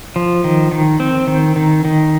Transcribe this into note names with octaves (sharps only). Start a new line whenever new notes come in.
F3
D#3
D#3
C4
D#3
D#3
D#3